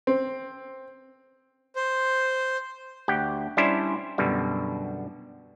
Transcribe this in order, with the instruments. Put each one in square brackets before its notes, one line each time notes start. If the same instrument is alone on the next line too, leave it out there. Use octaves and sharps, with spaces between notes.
[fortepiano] C4
[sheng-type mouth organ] C5
[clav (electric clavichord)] D2 G4 F#5 G5
G3 C#4 D4 E4 G4 C5
F#2 B2 D3 G3